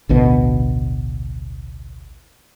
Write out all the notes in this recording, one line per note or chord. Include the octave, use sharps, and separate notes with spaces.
A1 D2 B2